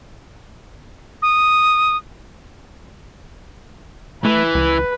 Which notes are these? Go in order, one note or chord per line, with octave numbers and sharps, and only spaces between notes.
D#6
E3 A3 B4
C#2